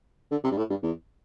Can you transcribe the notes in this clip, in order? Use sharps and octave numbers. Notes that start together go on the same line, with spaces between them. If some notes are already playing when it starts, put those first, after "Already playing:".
D3
C3
G2
A2
G2
E2